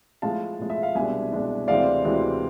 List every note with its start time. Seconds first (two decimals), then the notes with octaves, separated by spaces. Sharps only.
0.22 A2 F3 G#3 F5 A5
0.59 A2 F3 G#3
0.70 E5
0.83 F5
0.95 C2 B2 G#3 D4 E5 G#5
1.32 C2 B2 G#3 D4
1.68 D2 C3 E3 G#3 C4 D5 F5
2.04 D2 C3 E3 G#3 C4